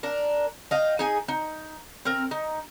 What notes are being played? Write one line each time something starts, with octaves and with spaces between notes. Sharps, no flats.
D4 A#4
D#5 F5 G5
D#4 G#4 G#5
D#4
C4 A#4
D#4